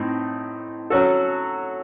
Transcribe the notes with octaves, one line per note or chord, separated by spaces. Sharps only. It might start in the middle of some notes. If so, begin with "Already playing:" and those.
Already playing: A2 C4 D#4
F#3 C#4 F#4 A4